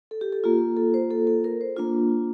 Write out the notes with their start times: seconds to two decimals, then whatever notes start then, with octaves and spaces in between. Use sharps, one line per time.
0.11 A4
0.21 G4
0.32 A4
0.44 A#3 F4 G4
0.77 A4
0.94 C5
1.10 A4
1.27 A4
1.44 A#4
1.61 C5
1.77 A#3 D4 F4